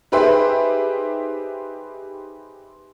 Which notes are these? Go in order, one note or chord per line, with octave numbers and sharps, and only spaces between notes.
D#4 G4 G#4 B4 C5 E5